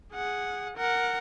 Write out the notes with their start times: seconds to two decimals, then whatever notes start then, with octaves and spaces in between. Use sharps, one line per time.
0.14 G#4 F#5
0.77 A#4 F#5